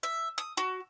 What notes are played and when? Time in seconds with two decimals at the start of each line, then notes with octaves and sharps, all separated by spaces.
0.03 E5
0.38 D#6
0.57 F#4